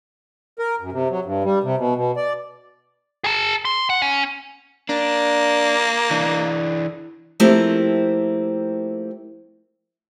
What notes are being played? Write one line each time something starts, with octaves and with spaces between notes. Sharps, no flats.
A#4
F#2
C3
F#3
G2
G3
C3
B2
B2
D5
G#4 A5
C6
F#5
C#4
A#3 D4
E3 D4
F3 A3 A#3 C4 E4 G4